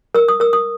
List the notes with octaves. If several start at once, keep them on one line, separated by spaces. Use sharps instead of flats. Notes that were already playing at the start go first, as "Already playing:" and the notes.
A#4 E6
D#6
A#4 E6
D#6